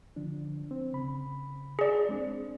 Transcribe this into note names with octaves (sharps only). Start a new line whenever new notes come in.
D3 F3 D4
C4
C#3 B5
G#4 D5
G#3 C4 D4